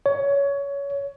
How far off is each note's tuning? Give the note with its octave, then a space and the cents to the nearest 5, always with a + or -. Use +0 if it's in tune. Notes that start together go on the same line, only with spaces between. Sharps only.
C#5 +20